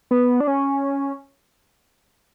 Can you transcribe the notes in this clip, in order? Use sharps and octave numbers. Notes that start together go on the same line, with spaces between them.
B3
D4
C#4